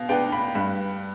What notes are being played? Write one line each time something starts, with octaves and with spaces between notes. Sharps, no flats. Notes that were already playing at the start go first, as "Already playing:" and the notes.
Already playing: B2 F5
B3 D4 G5
B5
G2 B5